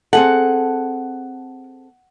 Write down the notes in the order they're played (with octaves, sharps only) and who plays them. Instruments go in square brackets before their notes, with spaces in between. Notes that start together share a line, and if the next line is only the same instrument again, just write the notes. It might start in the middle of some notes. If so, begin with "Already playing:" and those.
[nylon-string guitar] C4 G#4 A4 [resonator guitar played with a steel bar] F#5